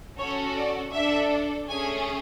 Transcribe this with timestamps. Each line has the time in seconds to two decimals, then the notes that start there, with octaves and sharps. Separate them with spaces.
0.18 C#4 F#4 A4 C#5
0.56 D5
0.93 D4 A4 E5
1.68 A3 C#4 G#4 G#5